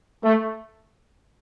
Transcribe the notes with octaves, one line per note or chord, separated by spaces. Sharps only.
A3